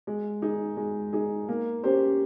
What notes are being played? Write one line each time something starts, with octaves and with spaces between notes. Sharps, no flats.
G#3
D#4 G#4
G#3
D#4 G#4
A#3
C#4 G4 C5